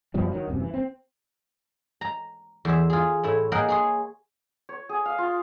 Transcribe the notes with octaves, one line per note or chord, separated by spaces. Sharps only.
F#2 B2 F3 G3
D#3 E3 F#3
D#1 F#2 C3
E3
C4
A#5
E2 C5 E5
F4 G#4
A2 E4 C#5
A#3 G#4 A#4 D#5 F#5 G5
G#4 C#5 C6
C#5
G#4
F5
F4